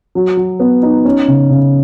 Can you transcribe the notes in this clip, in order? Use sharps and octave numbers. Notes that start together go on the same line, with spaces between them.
F#3
F#3
B3
D#4
C#4
C#3
C#3